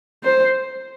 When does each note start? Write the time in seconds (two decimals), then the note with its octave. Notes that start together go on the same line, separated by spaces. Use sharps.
0.24 C5